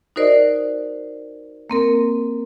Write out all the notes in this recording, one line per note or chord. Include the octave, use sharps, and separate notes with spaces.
D#4 F#4 A#4 C5 D5 D#5
A#3 C4 A#4